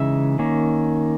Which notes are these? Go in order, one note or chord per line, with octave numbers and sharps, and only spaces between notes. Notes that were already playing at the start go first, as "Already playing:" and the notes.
Already playing: C#3 E3 G#3 D#4 E5
D#3 A#3 C#4